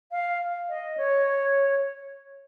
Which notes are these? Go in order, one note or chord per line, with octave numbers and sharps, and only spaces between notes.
F5
D#5
C#5